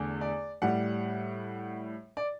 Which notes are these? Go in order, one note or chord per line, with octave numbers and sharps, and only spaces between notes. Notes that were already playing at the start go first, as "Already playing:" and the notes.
Already playing: E2 D3 A3
D5
A2 G3 F#5
D5